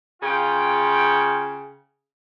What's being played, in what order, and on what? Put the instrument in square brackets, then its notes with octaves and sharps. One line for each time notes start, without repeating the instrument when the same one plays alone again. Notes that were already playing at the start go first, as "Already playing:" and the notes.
[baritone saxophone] C#3 [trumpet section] F4 G5